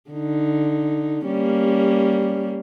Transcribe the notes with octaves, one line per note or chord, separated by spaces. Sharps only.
D3 D#4
G3 A#3 C#4